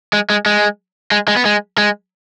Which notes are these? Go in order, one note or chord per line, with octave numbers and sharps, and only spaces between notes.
G#3
G#3
G#3
G#3
G#3
B3
G#3
G#3